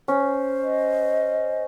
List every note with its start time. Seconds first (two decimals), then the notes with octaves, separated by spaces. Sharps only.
0.08 C#4 C5
0.62 D#5